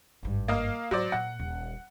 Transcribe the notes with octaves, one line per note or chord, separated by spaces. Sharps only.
G#1 G2
A#3 D#5 F5
G#2 F#3 C5 D5
A#2 F#5
D#1